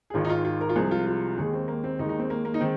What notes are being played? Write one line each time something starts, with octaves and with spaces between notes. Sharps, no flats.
G#4
G#1 G#2 D#3 F4
D#4
F4
F4
A#4
F4
C2 C3 F3 G#3 G#4
F4
F4
D#2 D#3 G#3 G#4
C4
A#3
C4
D#2 D#3 G#3 D#4
D#4
C4
A#3
A#3
D#4
D#3 G#3 C4